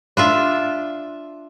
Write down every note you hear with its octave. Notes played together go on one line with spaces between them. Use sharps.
D4 F4 E5